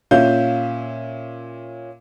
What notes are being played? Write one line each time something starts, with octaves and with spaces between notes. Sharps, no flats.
A#2 C#4 E5 F5 G6